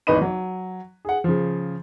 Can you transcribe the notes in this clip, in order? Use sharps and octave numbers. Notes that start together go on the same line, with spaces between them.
G#1 E2 B4 D#5 B5 D#7
F#3
G#4 F#5
C#3 F3